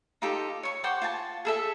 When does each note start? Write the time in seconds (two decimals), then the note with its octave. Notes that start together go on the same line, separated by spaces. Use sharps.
0.22 D#4 F4 G4 A4
0.63 C#5 C#6
0.84 C5 F#5 G5 D6
1.02 F4 G#5 A5
1.45 G#4 A4 E5